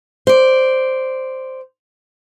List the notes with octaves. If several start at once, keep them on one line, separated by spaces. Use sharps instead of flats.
C5 D5